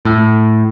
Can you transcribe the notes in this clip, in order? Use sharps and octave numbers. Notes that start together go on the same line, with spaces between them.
A2